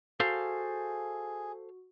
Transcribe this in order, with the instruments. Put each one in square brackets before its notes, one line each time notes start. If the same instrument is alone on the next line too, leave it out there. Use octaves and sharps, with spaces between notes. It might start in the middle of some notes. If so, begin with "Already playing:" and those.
[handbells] F#4 [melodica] G#4 [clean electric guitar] A4 C5 F5